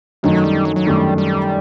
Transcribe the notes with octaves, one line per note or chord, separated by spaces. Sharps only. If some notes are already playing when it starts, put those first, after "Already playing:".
F#2 D#3 F#3 A3 D#4
G3
F#3
F#3
F#2 D#3 G3 A3 D#4
G3